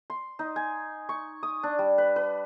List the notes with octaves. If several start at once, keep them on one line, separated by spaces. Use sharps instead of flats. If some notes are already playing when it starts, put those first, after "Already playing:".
C6
D#4
G#5
C#6
D#6
D4
G3
B4
B4